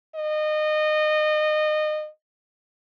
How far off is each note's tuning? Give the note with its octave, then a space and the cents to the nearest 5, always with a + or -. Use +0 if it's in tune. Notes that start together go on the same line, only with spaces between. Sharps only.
D#5 -25